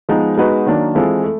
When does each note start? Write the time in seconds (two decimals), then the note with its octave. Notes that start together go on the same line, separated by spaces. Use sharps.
0.09 F3 G#3 B3 D#4
0.38 G#3 B3 D#4 F#4 B4
0.66 D#3 F#3 A#3 D4
0.95 E3 G#3 C4 F4 A4
1.24 A3